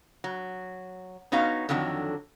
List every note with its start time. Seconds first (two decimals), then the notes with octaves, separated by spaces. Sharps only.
0.24 F#3
1.32 B3 C#4 D#4 F#4 F5
1.69 F2 D3 D#3 F#3 D4